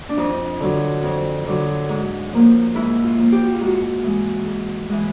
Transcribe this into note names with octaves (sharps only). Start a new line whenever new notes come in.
D4
F2 D#4
D3 F#3
F2
D3 F#3
G#2
F3 A#3
G#2 E4
F4
F3 A#3
G4
F#4
F4
G#2 F#4
E3 G#3
G#2
E3 G#3